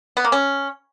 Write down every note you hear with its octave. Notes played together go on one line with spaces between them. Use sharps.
B3
A#3
C#4